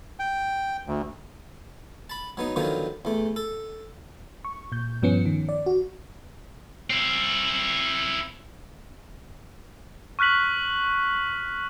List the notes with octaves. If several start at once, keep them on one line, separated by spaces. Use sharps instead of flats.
G5
D2
A5 B5
F#3 B3 D#4
D3 D#3 F3 F#3 B3
E2 A3
A4
C#6
A#2 G6
G2 F3 B3 C#4 C#7
D#3
D5
F#4
C4 E4
C#6 F6 F#6 B6 F#7